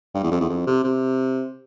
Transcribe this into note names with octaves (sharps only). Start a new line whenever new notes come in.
G2
E2
F2
E2
F2
C3
C3